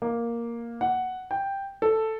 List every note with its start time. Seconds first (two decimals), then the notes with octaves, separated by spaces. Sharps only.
0.02 A#3
0.81 F#5
1.31 G5
1.82 A4